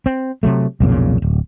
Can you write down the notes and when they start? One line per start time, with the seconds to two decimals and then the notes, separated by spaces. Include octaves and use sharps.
0.06 C4
0.43 C3 F#3 A3
0.80 B1 F2 A#2 C#3
1.22 D1